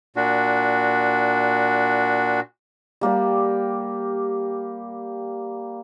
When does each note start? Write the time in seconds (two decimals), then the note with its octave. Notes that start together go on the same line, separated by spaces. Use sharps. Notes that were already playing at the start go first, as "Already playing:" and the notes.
0.16 A#2 D4 F#4
3.01 G3 A#3 G4 D5